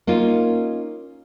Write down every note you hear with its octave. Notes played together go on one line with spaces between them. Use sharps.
A#3 C#4 D#4 F4